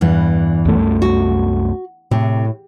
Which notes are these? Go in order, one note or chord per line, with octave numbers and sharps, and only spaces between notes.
E2 G2 E3
C2 F#2 A3
F#4
A2 C3